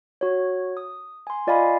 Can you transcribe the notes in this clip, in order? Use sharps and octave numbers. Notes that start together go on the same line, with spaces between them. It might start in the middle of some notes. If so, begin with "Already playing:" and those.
F#4 C#5
D#6
G#5 C6
F4 D5 D#5 F5 G#5 B5